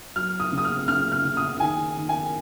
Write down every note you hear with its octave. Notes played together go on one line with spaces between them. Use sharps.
F#3 F6
D#6
C#3
D#6
F6
C#3 F6
F6
C#3
D#6
D#3 G#5
D#3
G#5